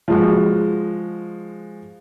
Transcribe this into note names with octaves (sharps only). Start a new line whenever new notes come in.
F3 G#3 F#4